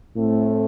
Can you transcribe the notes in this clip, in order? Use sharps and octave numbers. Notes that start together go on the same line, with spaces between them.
A2 A3 C4